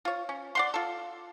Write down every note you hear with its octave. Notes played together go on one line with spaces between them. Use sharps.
F4 C#5
C#4
D5 F#5 C6
F4 A4